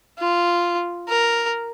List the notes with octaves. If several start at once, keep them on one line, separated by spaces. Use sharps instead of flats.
F4
A#4